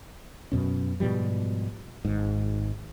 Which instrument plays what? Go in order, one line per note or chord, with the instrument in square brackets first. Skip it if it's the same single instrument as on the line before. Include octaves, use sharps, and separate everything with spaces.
[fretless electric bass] F#2 B2 C#4
G#2 B2 F3 G3
G#1 G#2